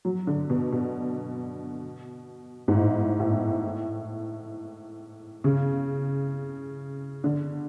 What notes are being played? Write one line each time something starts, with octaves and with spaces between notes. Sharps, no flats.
F#3
D3
B2
B2
G#2
A2
A2
C#3
D3